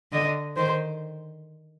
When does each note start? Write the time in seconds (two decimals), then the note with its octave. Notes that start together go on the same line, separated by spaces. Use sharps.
0.12 D3 D#5
0.57 D#3 C5